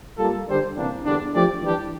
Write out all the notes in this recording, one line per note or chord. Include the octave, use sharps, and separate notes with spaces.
G3 A#3 F4 A4
D3 G3 D4 G4 C5
C3 E3 G3 A#3 D4
E2 D3 G3 D4
F3 A3 D4 G4 D5
E3 G3 D4 G4